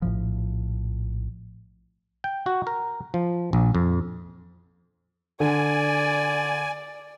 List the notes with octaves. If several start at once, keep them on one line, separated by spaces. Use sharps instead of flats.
A#1 A2 F3
G5
F#4
A#4
F3
A#1
F2
D3 D5 G#5